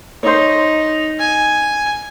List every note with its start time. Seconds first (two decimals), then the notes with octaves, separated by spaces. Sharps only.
0.23 D#4 C5 C#5
1.19 G#5